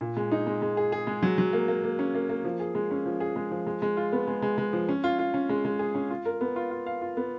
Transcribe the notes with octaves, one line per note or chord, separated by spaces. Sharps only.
A#2
G#3
D#4
G#3
G#3
G#4
G#4
G#3
F#3
F#3
A#3
A#3
A#3
C#4
A#3
A#3
F3
G#4
G#3
C#4
F3
G#4
G#3
F3
G#3
G#3
F4
B3
G#3
G#3
G#3
F3
C#4
F4
F4
C#4
G#3
G#3
G#4
C#4
F4
A#4
B3
F4
F4
F5
F4
B3